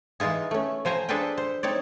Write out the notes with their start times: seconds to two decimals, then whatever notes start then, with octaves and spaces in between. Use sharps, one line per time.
0.20 E3 G#3 D#4 F4 G#4
0.51 A3 C#4
0.85 F3 C5 G#5 A#5
1.09 D4 G#4 A4 B4 C5 G5
1.38 C5
1.63 C4 D#4 C#5 D5